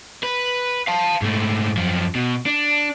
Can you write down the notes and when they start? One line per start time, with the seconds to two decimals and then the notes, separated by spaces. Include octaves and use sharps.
0.23 B4
0.87 F5 A5
1.22 G#2 A3
1.77 F#2 F3
2.15 B2
2.46 D4